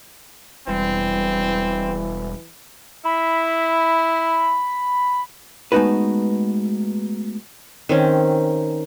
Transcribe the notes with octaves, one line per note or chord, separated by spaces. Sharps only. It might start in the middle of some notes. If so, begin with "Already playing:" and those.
E1 E3 G3 C4
E4 B5
G#3 A3 B3 D#4 F#4 B4
D#3 C4 C#4